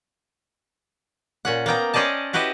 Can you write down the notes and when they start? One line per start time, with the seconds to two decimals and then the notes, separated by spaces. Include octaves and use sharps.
1.45 A#2 C#4 F#5
1.66 A#3 B3 G5 A#5
1.94 C#4 C5 D5 D#5 A5
2.33 E4 F#4 G4 B4 D#5